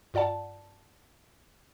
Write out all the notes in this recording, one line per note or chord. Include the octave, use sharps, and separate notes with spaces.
G2 F4 D5 F#5 A5